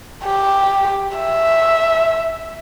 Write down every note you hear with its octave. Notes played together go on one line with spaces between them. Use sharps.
G4
E5